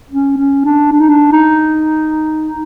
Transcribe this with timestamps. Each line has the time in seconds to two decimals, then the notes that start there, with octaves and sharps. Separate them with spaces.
0.11 C#4
0.38 C#4
0.65 D4
0.92 D4
1.00 D#4
1.09 D4
1.32 D#4